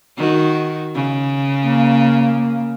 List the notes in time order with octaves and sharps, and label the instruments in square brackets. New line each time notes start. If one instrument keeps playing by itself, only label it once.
[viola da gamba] D#3 F#4
C#3
[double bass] A#3